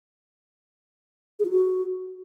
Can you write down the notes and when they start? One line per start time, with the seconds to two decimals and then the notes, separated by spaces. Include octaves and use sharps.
1.39 G#4
1.45 F4
1.51 F#4